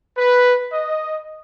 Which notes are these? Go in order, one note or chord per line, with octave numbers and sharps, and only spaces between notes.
B4
D#5